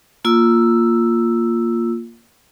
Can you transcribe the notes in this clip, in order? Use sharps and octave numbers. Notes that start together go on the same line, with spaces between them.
A#3 F4 E6